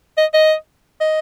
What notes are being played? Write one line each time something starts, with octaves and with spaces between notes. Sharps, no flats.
D#5
D#5
D#5